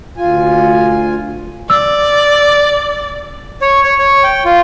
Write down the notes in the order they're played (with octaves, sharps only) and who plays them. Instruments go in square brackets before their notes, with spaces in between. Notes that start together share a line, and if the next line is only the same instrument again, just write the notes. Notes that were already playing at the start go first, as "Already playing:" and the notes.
[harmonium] D2 F4 G#5
[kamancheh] D5 [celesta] E6
[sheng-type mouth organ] C#5
C#5
C#5
G5
F4